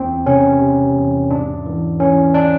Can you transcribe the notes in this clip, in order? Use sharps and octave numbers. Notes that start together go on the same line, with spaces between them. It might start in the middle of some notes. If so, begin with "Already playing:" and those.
Already playing: E2 C4
C3 C#4
C3
E2
G#2 D4
E3
E3 C#4
D4